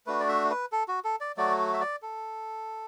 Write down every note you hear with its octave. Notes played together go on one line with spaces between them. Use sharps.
A3 D4 F#4 B4
D5
E5
B4
A4
F#4
A4
D5
F#3 A3 F#4 D5
E5
D5
A4